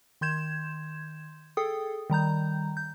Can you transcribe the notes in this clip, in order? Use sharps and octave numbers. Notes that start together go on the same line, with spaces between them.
D#3 C6 G6 G#6 E7
G#4 A4 G5 D#6
D#3 G3 A#5 G6
G6